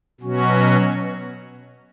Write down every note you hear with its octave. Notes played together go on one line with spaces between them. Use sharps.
B2 F#3 C#4 F#4